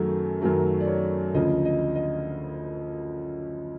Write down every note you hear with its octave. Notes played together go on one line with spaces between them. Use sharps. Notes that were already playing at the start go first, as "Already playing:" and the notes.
Already playing: F#2 D#3 F#3 A3 G#4
F#2 D#3 F#3 A3 A#4
D5
C#5
D2 C#3 F3 D#5
D#5
D#5